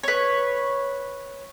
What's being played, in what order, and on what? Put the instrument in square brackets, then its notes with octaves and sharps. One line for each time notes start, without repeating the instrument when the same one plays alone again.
[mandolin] B4 C#5